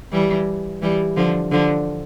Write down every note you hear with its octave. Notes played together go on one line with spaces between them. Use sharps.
E3 G3
E3 G3
D3 F3
D3 F3